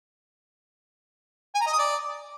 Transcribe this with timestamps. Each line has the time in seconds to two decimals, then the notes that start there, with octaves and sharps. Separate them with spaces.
1.55 G#5
1.61 A#5
1.67 D#5
1.72 D#6
1.78 D5